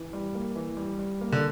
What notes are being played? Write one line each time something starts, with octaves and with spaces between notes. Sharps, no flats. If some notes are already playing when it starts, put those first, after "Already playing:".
Already playing: E3
G3
A#3
E3
G3
G3
A#3
D3